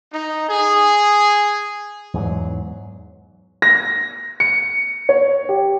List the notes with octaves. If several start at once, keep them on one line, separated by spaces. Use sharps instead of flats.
D#4
G#4
E2 G#2 F#3
A#6
C#7
C#5
G4